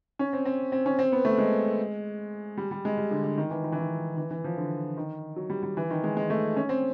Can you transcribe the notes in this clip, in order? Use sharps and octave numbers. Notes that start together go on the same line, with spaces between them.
C#4
C4
C4
C4
C#4
C4
B3
A3
G#3
G3
G3
G#3
G3
D3
D3
D#3
E3
D#3
E3
D#3
E3
E3
F3
D3
D#3
F#3
G3
G3
E3
D#3
G#3
G#3
A3
C#4
C4